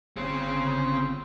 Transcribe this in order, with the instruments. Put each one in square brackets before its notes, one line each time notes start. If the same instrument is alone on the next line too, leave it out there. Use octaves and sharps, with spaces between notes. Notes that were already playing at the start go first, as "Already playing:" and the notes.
[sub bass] G1 [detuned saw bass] C#3 [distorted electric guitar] C4